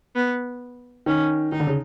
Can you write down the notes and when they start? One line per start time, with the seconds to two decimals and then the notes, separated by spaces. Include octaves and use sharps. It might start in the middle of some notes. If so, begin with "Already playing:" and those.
0.16 B3
1.06 D#3 C#4
1.52 D#3 D#4
1.60 D3
1.67 C#3